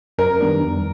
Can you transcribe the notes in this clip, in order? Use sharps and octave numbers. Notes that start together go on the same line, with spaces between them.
F#2 A#4
D#3 G3 B3 D4
F2